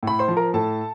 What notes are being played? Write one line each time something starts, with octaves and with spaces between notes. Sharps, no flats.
A2 B5
C5 C6
F3
A#4 A#5
A2 A4 A5